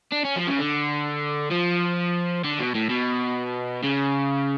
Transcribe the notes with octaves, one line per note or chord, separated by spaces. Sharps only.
D4
C#4
F3
C#3
D3
F3
D3
B2
A2
B2
C#3